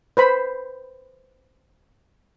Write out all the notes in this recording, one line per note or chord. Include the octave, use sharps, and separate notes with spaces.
B4 C5 B5